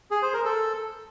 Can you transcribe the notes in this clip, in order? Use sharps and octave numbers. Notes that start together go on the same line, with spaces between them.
G#4
C5
A#4
A4